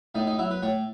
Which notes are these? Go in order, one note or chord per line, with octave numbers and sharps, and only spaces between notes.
A2 D#4
D#4
F#3 E4
B4
A2 C#5